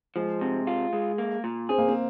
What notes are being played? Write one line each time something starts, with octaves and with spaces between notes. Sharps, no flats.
F3 G#3
C3
F4
G#3
A#3
A#2
C4 G#4
A#3
C4